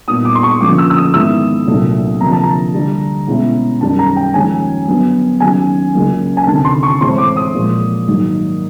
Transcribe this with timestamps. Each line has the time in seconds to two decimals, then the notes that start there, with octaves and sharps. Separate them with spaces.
0.08 A#2 G3 B3 D#4 D#6
0.25 D6
0.35 C6
0.43 C#6
0.61 D2 C#3 F3 A#3 D6
0.78 E6
0.90 E6
0.97 D#6
1.14 G#2 D#3 G#3 B3 E4 E6
1.67 C2 A#2 F#3 A3 D4
2.21 D2 C3 F3 A#3 D4 A#5
2.32 A5
2.43 A#5
2.74 D2 D3 G3
3.27 B2 G#3 C#4 E4
3.81 F#2 D#3 G3 A5
3.99 A#5
4.16 G5
4.34 D#2 C#3 F3 G#3 C#4 G#5
4.87 G2 D3 F#3 B3
5.40 D#2 C#3 F#3 G#5
5.94 C#2 C#3 F#3 A#3
6.37 G#5
6.47 D2 C3 D#3 A5
6.65 C6
6.83 C#6
7.01 A2 E3 G#3 C4 E4 C6
7.18 D6
7.36 D#6
7.54 A#2 F3 G#3
8.07 G#2 D#3 F#3 A#3 D#4